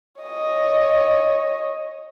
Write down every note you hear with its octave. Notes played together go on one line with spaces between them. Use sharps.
C#5 D#5